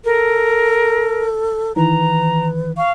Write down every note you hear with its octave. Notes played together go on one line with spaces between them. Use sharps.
A4 A#4
D#3 E3 B4 A#5
F5 C#6